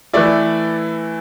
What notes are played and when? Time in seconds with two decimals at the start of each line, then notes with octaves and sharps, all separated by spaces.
0.13 E3 A3 E4 D5